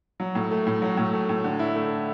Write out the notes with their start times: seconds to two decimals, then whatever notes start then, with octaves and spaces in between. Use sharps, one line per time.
0.20 F#3
0.35 A2
0.51 A3
0.67 A2
0.82 F#3
0.97 A2
1.13 A3
1.29 A2
1.44 D3
1.59 E4
1.75 A3